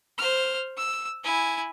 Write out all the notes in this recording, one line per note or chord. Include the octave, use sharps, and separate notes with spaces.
C5 F6
E6
E4 G#5